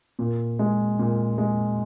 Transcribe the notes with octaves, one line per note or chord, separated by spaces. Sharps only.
A#2
G#3
A#2
G#3